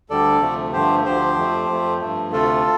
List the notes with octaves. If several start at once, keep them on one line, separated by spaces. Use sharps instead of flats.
D2 D3 G3 A4 D5
D2 C3 F3 A3
G2 D3 F3 A3 G4 C5
D2 D3 F3 G4 C5
F2 F3 A3
F2 F3 A3
G2 F3 A3
D2 C3 A3 F4 A4